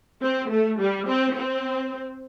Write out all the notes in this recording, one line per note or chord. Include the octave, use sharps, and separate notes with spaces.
C4
A3
G3
C4
C4